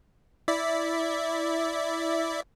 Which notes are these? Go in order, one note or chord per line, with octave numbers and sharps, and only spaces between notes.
E4 D5 E5